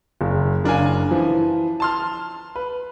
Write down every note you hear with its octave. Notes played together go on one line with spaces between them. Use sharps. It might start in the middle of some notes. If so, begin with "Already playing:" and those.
F#1
F#1 D4 A#4 F5 G#5
E3 F3
A5 C6 F6
B4